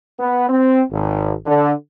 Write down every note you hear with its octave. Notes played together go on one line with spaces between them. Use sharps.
B3
C4
G#1
D3